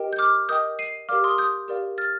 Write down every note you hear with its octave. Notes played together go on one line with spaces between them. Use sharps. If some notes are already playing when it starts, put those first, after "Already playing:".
Already playing: G4 A#4 D#5 G5
G6
D6 F6
A#4 D#5 G5 D#6 G6
C7 D#7
G4 A#4 D5 F5 D6 F6
C6 D#6
D#6 G6
G4 A#4 D5 F5
F6 A6